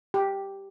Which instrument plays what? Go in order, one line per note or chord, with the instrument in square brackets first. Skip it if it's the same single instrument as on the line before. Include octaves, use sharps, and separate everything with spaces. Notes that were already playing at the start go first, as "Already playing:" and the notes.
[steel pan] G4